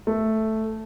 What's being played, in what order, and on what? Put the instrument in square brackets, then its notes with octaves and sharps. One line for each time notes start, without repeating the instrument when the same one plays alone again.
[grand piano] A3